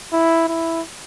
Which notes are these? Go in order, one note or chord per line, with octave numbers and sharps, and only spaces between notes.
E4
E4